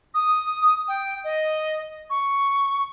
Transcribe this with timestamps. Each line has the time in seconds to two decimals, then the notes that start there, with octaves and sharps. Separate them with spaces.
0.15 D#6
0.88 G5
1.24 D#5
2.10 C#6